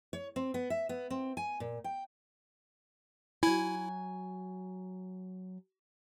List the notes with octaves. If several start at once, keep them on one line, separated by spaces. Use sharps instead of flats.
C#5
C4
B3
E5
B3
C4
G#5
A#2
G5
F#3 E4 G#5